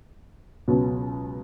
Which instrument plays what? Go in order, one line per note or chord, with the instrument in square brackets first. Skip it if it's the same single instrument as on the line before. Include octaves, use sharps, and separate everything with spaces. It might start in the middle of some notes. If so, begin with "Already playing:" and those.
[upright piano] C#2 B2 F#3